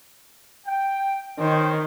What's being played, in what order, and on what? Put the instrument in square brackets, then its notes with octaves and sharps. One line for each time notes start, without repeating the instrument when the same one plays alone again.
[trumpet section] G5
[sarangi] D#3 [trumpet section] C5 C#5 G5